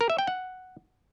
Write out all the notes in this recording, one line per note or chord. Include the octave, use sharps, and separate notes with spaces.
A#4
E5
G5
F#5